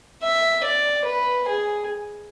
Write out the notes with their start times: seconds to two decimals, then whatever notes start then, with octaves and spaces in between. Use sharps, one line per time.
0.23 E5
0.64 D5
1.05 B4
1.48 G#4